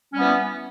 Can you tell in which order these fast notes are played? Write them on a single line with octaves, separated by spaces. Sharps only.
C#4 G3 B3 E3